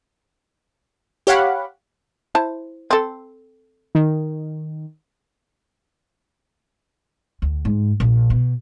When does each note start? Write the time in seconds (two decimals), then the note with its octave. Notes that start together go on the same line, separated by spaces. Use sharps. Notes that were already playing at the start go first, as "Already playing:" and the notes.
1.27 G4 C#5 F5 F#5 B5
2.35 E4 C5 A5
2.91 C4 A4
3.95 D#3
7.42 D2
7.65 G#2
8.00 A#1
8.30 B2